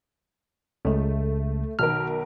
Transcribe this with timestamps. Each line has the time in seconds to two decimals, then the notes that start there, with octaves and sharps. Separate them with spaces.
0.85 C#2 C#3 A3
1.79 B1 D#3 A#4 F6